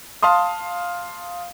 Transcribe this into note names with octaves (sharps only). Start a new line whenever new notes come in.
F5 A5 C6 D#6